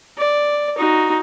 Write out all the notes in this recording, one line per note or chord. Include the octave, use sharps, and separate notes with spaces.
D5
D#4 F#4